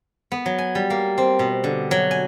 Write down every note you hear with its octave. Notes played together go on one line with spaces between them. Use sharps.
B3
F#3
G#5
G3
A#3
C4
B2
D3
F#3
G#5